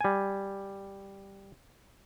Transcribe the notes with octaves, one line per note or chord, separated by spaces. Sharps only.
G3 G#5